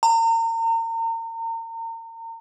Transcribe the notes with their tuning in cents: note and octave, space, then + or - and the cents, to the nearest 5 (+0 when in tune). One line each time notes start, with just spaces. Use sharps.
A#5 -35